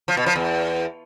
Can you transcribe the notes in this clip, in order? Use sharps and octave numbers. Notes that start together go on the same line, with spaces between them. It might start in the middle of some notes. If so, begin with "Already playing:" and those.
F3
B2
F3
E2